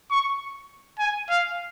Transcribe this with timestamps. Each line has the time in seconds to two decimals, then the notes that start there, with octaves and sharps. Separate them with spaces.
0.11 C#6
0.99 G#5
1.29 F5